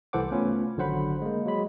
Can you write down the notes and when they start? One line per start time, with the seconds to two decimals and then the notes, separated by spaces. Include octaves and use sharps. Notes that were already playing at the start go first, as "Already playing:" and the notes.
0.13 C2 E3 A4 C5 F#5 D6
0.31 A3 B3 C#4 F4 B4
0.77 G#1 D3 F#3 C5 F#5 B5
1.22 G#3 A#3
1.46 F#3 G#3 B5